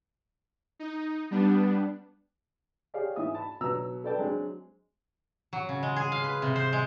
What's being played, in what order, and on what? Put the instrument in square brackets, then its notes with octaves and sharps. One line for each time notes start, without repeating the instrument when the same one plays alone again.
[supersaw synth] D#4
G3 B3 D4
[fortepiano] G4 G#4 C#5 D5 F5
G#2 E3 D#5 E5 D#6
A5 B5
B2 F#3 B3 A#5 E6
A4 B4 D5 G5 A5
F#3 G#3 C4 D4
[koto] F#3
C#3
G#3
G#4
F5
B4
C3
C5
G#3